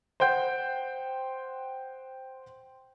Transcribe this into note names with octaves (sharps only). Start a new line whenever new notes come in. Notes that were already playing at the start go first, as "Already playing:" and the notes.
C5 F#5 G5 G6